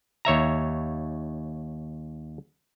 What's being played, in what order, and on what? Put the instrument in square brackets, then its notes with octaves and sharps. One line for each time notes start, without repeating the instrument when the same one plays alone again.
[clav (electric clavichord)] D#2 C#5 E5 A#5